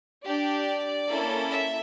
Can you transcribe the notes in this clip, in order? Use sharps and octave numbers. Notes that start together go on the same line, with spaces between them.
D4 G4 D5
A#3 C#4 E4 A4
E5